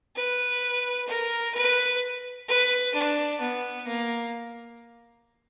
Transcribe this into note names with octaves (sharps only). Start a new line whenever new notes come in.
B4
A#4
B4
B4
D4
B3
A#3